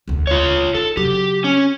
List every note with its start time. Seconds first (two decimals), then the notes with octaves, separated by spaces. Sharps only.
0.08 E1 D2
0.27 F4 C#5
0.75 D#3 A4
0.97 C#3 F#3 G4
1.44 C#4